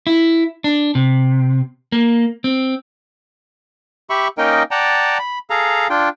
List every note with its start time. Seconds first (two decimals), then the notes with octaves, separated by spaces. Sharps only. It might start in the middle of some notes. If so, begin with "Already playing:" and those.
0.07 E4
0.64 D4
0.95 C3
1.92 A#3
2.44 C4
4.10 G4 E5 B5 C#6
4.38 A#3 C#4 D#4 A#4 D#5 G5
4.71 D5 F#5 G5 A5 A#5
5.19 B5
5.50 G#4 A4 F5 A#5
5.90 D4 F4 G5